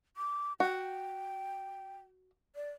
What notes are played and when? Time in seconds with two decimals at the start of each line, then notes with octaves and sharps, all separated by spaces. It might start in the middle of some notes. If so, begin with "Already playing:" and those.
0.17 D6
0.60 F#4 G5
2.56 D5